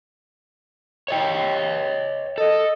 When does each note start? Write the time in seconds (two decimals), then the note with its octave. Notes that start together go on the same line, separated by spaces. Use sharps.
1.08 C#5 D#5 G5
2.38 A4 D#5